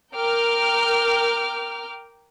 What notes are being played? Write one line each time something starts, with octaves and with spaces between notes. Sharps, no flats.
A#4 G5 D6 F6